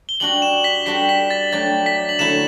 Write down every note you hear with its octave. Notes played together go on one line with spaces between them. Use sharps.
G7
G3 D4 F#4 F#7
E7
B6
G3 D4 F#4 A4 C5 B6
B6
A6
F#3 A3 D4 G4 A6
B6
F#7
D3 F#3 A3 E4 A4 E7